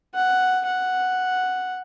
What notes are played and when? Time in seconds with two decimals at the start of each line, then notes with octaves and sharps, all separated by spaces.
0.15 F#5
0.66 F#5